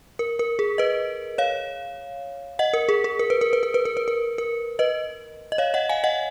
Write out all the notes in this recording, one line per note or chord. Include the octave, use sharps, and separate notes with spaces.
A#4
A#4
G#4
B4 D#5
C#5 F5
D#5 F#5
A#4
G#4
G#4
A#4
B4
A#4
B4
A#4
B4
A#4
B4
A#4
A#4
B4 D#5
D#5
C#5 F5
D#5 F#5
F5 G#5
D#5 F#5